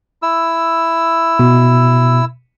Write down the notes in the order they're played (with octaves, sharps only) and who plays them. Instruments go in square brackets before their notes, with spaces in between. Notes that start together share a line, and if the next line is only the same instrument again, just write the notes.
[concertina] E4 E6
[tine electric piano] B2